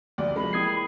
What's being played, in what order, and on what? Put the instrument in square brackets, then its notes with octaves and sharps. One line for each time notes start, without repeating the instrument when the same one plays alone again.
[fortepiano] D2 G3 [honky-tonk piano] D5
[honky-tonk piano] C3 G#3 [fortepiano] F3 [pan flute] B5
[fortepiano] E3 A#3 G4 [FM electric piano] D#6 G#6 C7